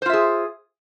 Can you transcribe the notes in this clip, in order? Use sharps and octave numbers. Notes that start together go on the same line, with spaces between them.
F4 G#4 C5 E5